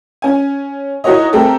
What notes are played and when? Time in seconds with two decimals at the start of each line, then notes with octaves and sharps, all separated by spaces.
0.22 C#4 G#5
1.04 D#4 E4 F#4 A#4 C#5 D#5
1.33 A3 C4 G4 A4 A#4